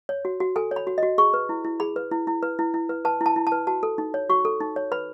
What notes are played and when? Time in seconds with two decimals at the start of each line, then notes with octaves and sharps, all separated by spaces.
0.09 C#5
0.25 F#4
0.40 F#4
0.56 A4 G#5
0.71 C#5
0.76 B5
0.87 F#4
0.98 F#4 D#5
1.18 G#4 C#6
1.34 B4
1.49 E4
1.64 E4
1.80 G#4 B5
1.96 B4
2.11 E4
2.27 E4
2.43 B4
2.59 E4
2.74 E4
2.89 B4
3.05 B4 A5
3.21 E4
3.26 A5
3.36 E4
3.47 A5
3.52 B4
3.67 F#4 A5
3.83 A4
3.98 D#4
4.14 C#5
4.30 F#4 C#6
4.45 A4
4.60 D#4
4.76 C#5
4.92 B4 B5